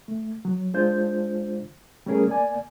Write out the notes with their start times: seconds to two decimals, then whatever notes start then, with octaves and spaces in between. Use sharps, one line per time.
0.08 A3
0.45 F#3
0.74 G#3 D4 F4 C5 G6
2.06 G3 A3 C#4 G#4 A#4
2.28 A#3 D5 G#5